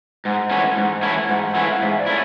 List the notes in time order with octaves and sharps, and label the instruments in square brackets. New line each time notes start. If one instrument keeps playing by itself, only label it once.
[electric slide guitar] G#2 [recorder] F#5
[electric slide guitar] E3 A3 C#4 E4
G#2
E3 A3 C#4 E4
[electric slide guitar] G#2 [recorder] F#5
[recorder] F5
F#5
[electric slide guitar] E3 A3 C#4 E4
[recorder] F5
[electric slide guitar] G#2 [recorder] E5
[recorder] D5
[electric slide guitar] A3 C#4 E4